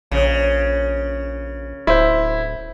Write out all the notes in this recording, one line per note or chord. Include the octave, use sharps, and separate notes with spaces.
A#1 C#3
D1 E4 C5